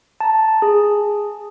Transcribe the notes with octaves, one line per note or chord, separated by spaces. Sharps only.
A5 A#5
G#4